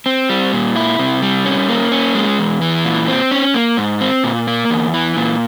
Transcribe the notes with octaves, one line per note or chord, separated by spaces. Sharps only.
C4
G3
A#2
E4
C3
G3
C#4
A#3
C#4
G#3
E2
E3
A#2
C4
C#4
A#3
G#2
C4
A#2
A#3
E2
E3
A#2